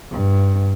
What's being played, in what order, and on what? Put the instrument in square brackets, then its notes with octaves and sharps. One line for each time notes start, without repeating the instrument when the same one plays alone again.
[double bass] G2